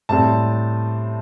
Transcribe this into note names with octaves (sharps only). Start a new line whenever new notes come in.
A2 G3 C4 A5